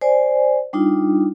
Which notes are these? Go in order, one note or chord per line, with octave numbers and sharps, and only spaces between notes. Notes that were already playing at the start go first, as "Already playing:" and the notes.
C5 D5 G#5
G3 D4 D#4 F4